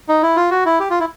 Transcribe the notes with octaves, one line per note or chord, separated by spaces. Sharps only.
D#4
E4
F4
F#4
E4
G4
F4
E4